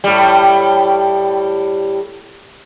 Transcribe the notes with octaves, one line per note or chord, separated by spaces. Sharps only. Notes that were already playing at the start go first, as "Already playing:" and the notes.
A2 G3